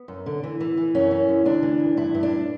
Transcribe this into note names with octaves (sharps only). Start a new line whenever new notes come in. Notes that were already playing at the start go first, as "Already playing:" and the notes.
Already playing: B3
F#2
D3
E3
E3
E3
F#2 C#4
E3
F#2
D2 D4
E3
D2
G2 E4
G2
D4
G2